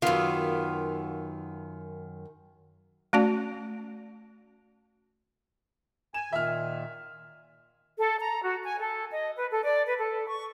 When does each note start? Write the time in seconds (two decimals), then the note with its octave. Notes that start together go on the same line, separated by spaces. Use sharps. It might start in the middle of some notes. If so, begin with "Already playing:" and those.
0.02 F#2 D#3 B3 F4
3.13 A3 C#4 F#4 D5 A5
6.14 G#5 E7
6.33 A#2 D#3 E5 F6
7.98 A4
8.20 A#5
8.43 F#4
8.63 G#5
8.79 A4
9.11 D#5
9.37 B4
9.51 A4
9.63 D5
9.86 B4
9.99 A4
10.27 C#6